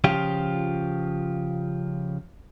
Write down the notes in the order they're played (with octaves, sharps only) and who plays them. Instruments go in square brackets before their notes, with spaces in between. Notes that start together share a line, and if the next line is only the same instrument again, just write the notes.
[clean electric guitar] C#3 F3 F4 G4